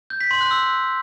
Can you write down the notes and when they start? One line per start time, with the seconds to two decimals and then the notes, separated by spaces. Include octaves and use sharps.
0.10 G6
0.21 B6
0.31 C6
0.41 F#6
0.51 E6